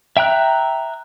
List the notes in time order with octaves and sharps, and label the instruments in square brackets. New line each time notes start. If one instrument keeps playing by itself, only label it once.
[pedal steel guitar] E5 G5 A#5 F#6